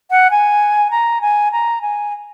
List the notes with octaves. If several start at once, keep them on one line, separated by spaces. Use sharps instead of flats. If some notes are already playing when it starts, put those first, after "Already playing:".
F#5
G#5
A#5
G#5
A#5
G#5